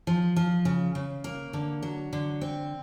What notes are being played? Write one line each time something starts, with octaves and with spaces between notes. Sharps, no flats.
F3
F3
C#3
C#3
A#3
D3
F#3
D3
C4